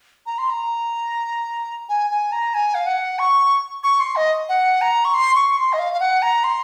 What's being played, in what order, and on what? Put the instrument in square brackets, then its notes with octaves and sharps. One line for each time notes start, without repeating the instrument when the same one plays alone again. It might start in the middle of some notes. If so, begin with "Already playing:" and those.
[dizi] A#5
C6
A#5
G#5
G#5
A#5
G#5
F5
F#5
C#6
C#6
C6
D#5
F#5
A#5
C#6
C6
C#6
C6
D#5
F5
F5
F#5
A#5
C6